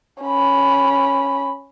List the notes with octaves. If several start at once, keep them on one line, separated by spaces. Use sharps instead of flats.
C#4 B5